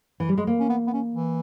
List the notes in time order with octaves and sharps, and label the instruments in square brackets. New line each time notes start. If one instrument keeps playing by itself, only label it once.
[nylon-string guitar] E3
G3
G#3
A#3
[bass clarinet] C#4
B3
B3
C#4
E3